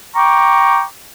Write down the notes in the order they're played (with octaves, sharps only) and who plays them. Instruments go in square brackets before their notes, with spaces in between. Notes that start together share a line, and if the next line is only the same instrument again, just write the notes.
[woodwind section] G5 A#5 C#6 D6